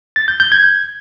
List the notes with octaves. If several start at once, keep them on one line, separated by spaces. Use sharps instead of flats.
A6
G6
G6
G#6